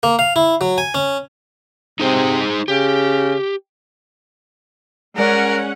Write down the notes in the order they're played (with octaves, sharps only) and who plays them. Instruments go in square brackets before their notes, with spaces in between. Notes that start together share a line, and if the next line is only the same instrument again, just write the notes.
[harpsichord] A#3
F5
E4
F#3
G#5
C#4
[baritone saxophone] C3 [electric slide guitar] D#4 G#4 C5
[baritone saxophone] C#3 [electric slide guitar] G4
[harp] G#3 D5 [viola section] C#4 F#5 [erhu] A#4